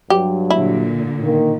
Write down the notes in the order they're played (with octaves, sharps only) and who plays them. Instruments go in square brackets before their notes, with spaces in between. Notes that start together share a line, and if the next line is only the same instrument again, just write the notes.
[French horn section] G2 F#3 [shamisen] G4
[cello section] A#2 D3 [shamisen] E4
[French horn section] D#3 A#3